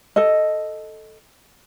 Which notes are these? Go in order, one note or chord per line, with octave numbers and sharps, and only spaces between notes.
A4 D#5